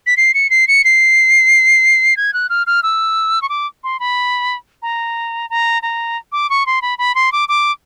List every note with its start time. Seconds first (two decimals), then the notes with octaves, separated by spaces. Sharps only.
0.07 B6
0.17 C7
0.34 C#7
0.50 C7
0.68 C#7
0.84 C7
2.17 G#6
2.34 F#6
2.50 F6
2.67 F6
2.83 E6
3.42 C#6
3.49 D6
3.84 C6
4.00 B5
4.82 A#5
5.50 A#5
5.82 A#5
6.32 D6
6.50 C#6
6.66 C6
6.82 B5
6.98 B5
7.15 C6
7.32 D6
7.49 D6